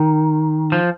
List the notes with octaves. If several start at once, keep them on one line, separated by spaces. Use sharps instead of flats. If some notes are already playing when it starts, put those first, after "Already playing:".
Already playing: D#3
F3